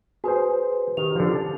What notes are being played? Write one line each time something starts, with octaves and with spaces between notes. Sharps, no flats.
F#4 G#4 B4 C5
D#3 G4 F7
D3 F3
A5